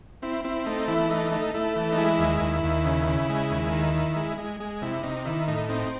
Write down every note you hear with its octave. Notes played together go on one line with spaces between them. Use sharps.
C4 E4
C4 E4
A3 D#4
E3 E4
A3 D#4
A3 D#4
A3 E4
E3
D#4
G#3 E4
D#2
D#2
D#2
C#3
C#3
G#3
D#2
D#3
D#3
G#3
G#3
G#3
C3 E4
C3 D#4
D#3 E4
A2 D#4
C4 D#4